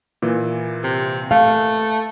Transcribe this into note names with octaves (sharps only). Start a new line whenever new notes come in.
A#2 E3
C3
A3 F5